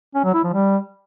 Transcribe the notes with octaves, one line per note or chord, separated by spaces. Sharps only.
C#4
F#3
E4
F3
G3